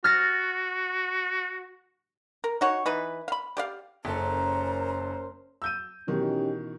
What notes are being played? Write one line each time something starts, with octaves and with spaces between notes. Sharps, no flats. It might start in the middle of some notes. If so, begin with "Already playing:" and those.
F#4 F6 A6 A#6
A#4
D#4 F#4 C#5
E3 D#4 B4
F5 B5
G4 D5 F5
F#1 C#4 A4 A#4 C5 A#5
E6 G6 D#7
B2 D#3 E3 C#4 D#4 G4